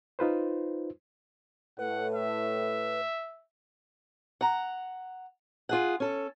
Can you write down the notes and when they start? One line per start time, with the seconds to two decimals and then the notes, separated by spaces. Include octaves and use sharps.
0.19 D#4 F4 B4 C5
1.79 A2 A3 B4 F#5
2.14 E5
4.41 F#5 A#5
5.69 F4 G#4 F#5
6.00 C#4 A4